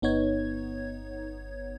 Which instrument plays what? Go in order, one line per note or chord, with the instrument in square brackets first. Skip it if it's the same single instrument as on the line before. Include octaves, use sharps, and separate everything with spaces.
[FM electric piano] G1 B3 D#4 C#5 G#6